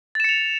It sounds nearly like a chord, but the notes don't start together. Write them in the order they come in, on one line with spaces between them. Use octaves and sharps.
A6 E7 C#7 F7